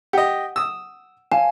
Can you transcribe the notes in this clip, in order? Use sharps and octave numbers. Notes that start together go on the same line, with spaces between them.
G4 D#5 F#5
D#6 E6
F5 G#5 A5